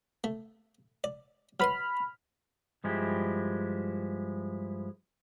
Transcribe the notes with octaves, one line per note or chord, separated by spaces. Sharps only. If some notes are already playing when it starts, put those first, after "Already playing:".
A3
D5
F#3 B4 B5 C6 F6
G2 F3 G#3 E4 G4